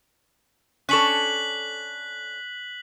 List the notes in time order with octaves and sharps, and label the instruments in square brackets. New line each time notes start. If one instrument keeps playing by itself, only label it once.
[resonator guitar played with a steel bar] C#4 D4 A4 [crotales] F#6 B6 F#7